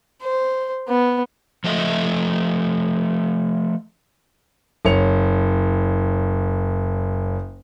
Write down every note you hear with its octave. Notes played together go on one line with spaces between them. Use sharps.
C5
B3
F3 A3 D#5 E5
F#1 C#5 C#7 F7